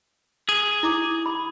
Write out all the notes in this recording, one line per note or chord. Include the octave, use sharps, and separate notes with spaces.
G#4
E4 D6
B5